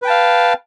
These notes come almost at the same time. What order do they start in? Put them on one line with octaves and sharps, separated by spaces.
B4 G5 A5 F5